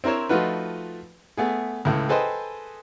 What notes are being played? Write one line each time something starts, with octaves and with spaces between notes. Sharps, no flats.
C4 E4 A#4 C5 C#5
F3 A3 D#4 F4 F#4 B4
A3 B3 G#4
C#2 A2
G#4 A4 B4 C5 D#5 G5